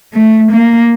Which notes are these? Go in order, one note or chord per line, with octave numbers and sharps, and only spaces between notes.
A3
A#3